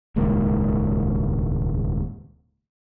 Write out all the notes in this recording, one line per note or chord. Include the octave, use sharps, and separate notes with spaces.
D#1 C#2 G#2 A#3